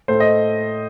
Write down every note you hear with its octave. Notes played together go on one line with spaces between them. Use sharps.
A2 A3 C5
D#5